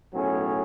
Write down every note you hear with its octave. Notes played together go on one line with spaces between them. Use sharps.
B1 A2 F#3 C#4 G#4